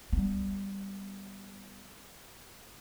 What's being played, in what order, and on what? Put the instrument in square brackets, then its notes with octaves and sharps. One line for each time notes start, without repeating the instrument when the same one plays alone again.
[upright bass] G3 B3